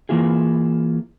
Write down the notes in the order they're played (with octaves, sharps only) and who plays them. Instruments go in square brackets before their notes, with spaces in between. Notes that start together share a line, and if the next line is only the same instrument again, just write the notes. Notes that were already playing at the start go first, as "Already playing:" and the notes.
[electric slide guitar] E3 A#3 E4 F4 G#4